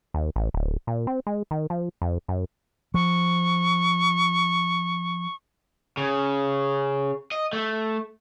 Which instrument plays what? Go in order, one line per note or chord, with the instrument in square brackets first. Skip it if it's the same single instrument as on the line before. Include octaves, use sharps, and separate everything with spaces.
[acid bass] D#2
A1
D1
A#2
C4
G#3
D#3
F3
F2
F#2
[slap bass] F3 [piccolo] C#6
[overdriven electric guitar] C#3
D#5
A3